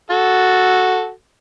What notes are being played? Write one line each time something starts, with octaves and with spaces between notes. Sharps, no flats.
F#4 A4